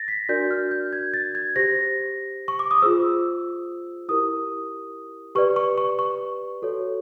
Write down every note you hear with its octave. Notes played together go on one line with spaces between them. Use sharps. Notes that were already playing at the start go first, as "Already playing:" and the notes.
Already playing: A6 A#6
B6
D4 F#4 A#4 D5 G6
F6
G6
G#6
A6
G#6
G4 C5 A#6
C#6
D6
D#6
F4 G#4 C5 E6
E4 G4 A#4 D#6
G4 B4 D5 C#6
C#6
C#6
C#6
F#4 A4 C#5